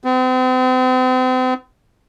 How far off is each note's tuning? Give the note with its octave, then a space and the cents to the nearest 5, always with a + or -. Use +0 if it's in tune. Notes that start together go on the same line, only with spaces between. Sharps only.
C4 -40